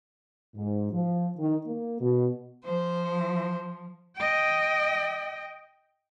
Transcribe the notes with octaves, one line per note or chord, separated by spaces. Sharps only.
G#2
F3
D#3
A#3
B2
F3 C5
D#5 G5